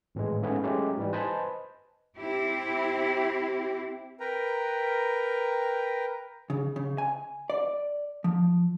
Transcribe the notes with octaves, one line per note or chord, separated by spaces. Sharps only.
G#1 A2 E3 G#3
G#2 A3 B3 C#4 E4
F#3 G#3 A3 C#4 G4
G#2 E3 G3
B4 C5 D#5 G#5 A5 B5
C4 E4 G4
A#4 B4 G5 A#5
C#3
C#3
G#5
D5
F3